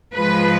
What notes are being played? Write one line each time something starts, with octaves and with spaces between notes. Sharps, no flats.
G#2 F3 G#3 B4